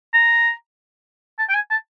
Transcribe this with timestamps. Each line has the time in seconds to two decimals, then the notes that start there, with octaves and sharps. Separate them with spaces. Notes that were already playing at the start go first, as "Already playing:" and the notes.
0.13 A#5
1.39 A5
1.49 G5
1.54 G#5
1.71 A5